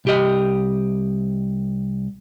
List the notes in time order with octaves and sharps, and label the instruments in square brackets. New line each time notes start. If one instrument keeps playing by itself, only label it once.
[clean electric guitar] C2 G4 D#5